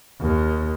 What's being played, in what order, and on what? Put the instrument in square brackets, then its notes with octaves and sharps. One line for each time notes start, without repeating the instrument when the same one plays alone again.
[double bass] D#2